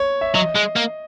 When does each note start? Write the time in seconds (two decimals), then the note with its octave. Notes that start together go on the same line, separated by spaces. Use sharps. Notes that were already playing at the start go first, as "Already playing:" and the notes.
Already playing: C#5
0.21 E5
0.34 F#3 D#5
0.56 G#3
0.76 A#3